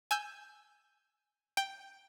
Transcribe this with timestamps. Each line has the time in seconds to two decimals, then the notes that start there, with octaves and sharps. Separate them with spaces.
0.11 G#5 E6 G6
1.57 G5